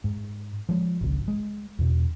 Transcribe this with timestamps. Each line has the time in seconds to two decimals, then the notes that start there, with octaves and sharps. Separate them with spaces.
0.04 G#2
0.69 F3 G#3
1.01 G#1 C#2
1.28 G#3
1.79 E2 B2